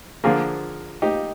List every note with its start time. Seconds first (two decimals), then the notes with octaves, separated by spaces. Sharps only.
0.24 D3 F3 A#3 F4 G#4
1.02 D#4 G4